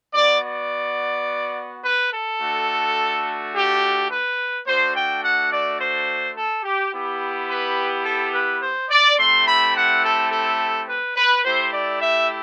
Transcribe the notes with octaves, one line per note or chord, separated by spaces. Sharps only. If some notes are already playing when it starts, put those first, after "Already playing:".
B3 F#4 D5
D5
B4
A4
A3 D4 F#4
G4
B4
A3 D4 F#4 C5
G5
F#5
D5
C5
A4
G4
B3 E4 G4
B4
A4
B4
C5
D5
A3 C4 E4 G4 C6
B5
F#5
A4
A4
B4
B4
A3 E4 G4 C5
D5
E5